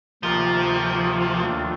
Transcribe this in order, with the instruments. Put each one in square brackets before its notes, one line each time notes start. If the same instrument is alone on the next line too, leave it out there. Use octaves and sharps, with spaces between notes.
[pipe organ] D2 C3 D#3 A#3 F4 [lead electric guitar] F3
[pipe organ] D#2 D#3 A3 D4 F4